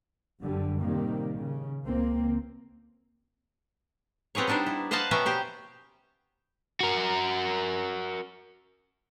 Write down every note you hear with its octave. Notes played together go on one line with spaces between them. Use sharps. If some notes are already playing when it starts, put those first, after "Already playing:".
G1 F#2 D3 G3
A2 C3 D#3 G3 A#3
C#3
C#2 A#3 C4
B3 C4 G4 G#4 C#5
G3 B3 D4 D#4 C5
E4
B4 C5 D#5 F5 F#5 A5
B2 B3 C#4 E5 G5 A#5
G4 C5 G5
F#4 A#4